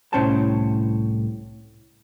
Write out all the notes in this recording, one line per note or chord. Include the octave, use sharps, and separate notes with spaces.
C2 A2 C#4 C5 G5 A5